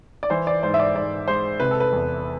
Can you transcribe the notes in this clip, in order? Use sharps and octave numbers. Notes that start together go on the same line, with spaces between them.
D5
E3 C5
D5
G#2 C5
E5
D5
G#2 D5
G#3 C5
C3 B4
A4
B4
E2